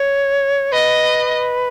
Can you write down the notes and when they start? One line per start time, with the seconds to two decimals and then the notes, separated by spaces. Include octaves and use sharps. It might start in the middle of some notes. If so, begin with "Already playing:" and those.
Already playing: C#5
0.72 B4 D#5